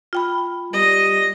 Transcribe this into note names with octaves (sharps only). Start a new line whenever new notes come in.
F4 G5 B5
G3 D#5